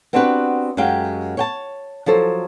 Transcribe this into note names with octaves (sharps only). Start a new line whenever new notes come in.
B3 C4 D4 F#4 G4 B4
F#2 G#3 G4 F5 G5
C#5 G5 A5
F3 F#3 A4 C5